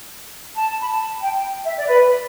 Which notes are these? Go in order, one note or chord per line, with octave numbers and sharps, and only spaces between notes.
A5
B5
A5
G5
E5
D5
B4